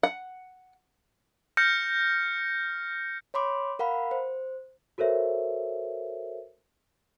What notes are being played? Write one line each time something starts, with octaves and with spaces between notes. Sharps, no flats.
F#5
F6 G6 A#6 C#7
C#5 B5 C6 D6
A#4 F5 F#5 B5
C5
F#4 A4 A#4 C5 C#5 E5